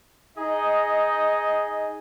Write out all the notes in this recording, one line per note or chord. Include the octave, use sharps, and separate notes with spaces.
D#4 G#4 D#5